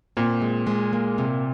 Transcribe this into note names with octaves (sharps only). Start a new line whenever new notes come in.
A#2 C4
G#3
G#3
A#3
C3